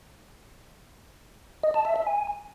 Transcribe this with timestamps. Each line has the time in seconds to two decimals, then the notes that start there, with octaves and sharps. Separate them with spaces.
1.64 D#5
1.74 A5
1.85 E5
1.96 E5
2.07 G#5